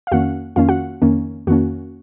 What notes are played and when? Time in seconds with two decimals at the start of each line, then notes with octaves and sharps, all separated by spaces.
0.07 F5
0.12 F2 D#3 A#3 C#4 F#4 F#5
0.56 F2 D#3 A#3 C#4 F4 F5
0.69 F#4 F#5
1.02 F2 D#3 A#3 C#4
1.47 F2 D#3 A#3 C#4 F#4